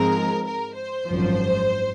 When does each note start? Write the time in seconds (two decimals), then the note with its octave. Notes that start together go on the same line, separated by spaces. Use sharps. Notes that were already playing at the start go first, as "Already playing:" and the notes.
Already playing: G#2 F3 G#3 C4 A#4
0.45 A#4
0.76 C5
1.07 G#1 F#2 F3